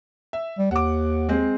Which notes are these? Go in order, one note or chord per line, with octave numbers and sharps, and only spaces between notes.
E5
G3
D#2 F#5 D6
G#3 C4